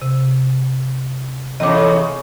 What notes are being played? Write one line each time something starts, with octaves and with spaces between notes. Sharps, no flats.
C3
E2 A2 C#3 D#5 D6